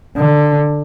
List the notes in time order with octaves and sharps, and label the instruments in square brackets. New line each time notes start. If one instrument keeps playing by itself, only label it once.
[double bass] D3